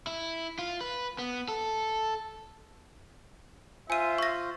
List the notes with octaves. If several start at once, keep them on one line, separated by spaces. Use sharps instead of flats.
E4
F4
B4
B3
A4
F4 C5 E5 G#5 D#7
C#6 A#6